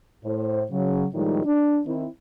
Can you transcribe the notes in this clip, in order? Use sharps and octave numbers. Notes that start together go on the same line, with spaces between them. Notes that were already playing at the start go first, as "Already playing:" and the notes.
A2 C5
C#3 F#3
A2 D#3 F3 G3 G#3 D#4
D4
D#3 C4 E4